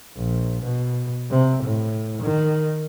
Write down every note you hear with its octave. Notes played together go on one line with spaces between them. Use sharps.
A#1
B2
C3
A2
D#3